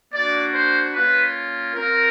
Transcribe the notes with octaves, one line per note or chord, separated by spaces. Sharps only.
A#3 D4 F#4 D5
C5
A#3 C#4 F4 B4
C4 F4 A#4